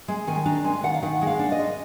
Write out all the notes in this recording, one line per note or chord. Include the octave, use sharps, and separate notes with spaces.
G#3
D#3 G#5
D4 A#5
G#3 G#5
D#3 F#5
F5
D#3 F#5
G#3
F5
D4
D#5
G#3